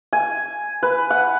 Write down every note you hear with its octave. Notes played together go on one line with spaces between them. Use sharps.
G#5
B4
F#5